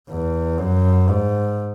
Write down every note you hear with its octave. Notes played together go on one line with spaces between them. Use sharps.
E2
F#2
G#2